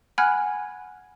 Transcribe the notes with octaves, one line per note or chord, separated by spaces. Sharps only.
F#5 G#5 B5 F6 F#6 G#6